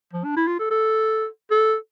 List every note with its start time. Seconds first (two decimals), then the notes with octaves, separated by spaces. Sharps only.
0.13 F3
0.24 D4
0.36 E4
0.48 F4
0.59 A4
0.71 A4
1.51 A4